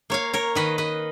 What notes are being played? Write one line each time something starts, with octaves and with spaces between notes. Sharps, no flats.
A#3 C#5 F5
A#4 C#5
D#3 B4 D#5
B4 D#5